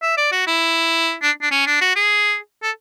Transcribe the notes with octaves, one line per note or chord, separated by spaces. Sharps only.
E5
D5
F#4
E4
D4
D4
C#4
D4
F#4
G#4
A4